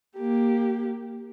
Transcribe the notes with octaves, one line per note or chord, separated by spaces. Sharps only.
A#3 G4